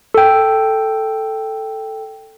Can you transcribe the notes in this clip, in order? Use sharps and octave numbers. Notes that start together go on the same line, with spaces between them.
A4 G5